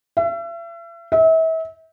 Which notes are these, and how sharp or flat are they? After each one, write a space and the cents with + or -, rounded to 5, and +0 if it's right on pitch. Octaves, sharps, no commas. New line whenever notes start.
E5 +40
E5 -35